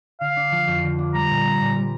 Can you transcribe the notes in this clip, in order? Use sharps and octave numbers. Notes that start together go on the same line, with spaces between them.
D3 F5
D4
F3
F2
D3
D4
G3 A#5
A#2
C4
A#2
G3